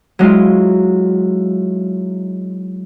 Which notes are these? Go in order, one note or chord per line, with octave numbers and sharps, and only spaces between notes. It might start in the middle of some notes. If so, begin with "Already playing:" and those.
F#3 G#3 E4 F4